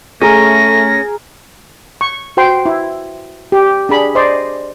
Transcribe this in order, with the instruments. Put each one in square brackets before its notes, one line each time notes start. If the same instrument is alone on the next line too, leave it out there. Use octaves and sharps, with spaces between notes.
[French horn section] A3 [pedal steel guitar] C#4 [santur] G#4 A#4 [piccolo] A#6
[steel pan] C#6
F#4 C5 G5 C6
E4
G4
D4 G#4 B5
C5 D5 D#5 C6